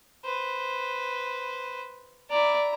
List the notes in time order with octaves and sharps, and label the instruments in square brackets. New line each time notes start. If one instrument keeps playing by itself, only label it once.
[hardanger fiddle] B4 C5
[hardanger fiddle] E4 A#5 [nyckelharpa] D5